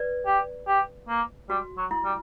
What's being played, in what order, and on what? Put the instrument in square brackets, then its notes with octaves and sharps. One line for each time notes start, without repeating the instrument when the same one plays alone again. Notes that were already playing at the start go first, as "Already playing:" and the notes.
Already playing: [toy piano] B4 D5
[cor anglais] G4
G4
A#3
[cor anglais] G3 [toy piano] F#4
[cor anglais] F#3
[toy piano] E4
[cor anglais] G3